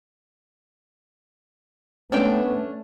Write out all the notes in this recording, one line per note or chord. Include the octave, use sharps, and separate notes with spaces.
A3 B3 C#4 D4 G5